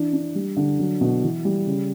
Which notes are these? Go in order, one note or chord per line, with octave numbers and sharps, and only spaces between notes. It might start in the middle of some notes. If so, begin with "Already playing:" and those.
Already playing: E3 D4
D4
G3
D3
F#3
B2
E3
G3
C#3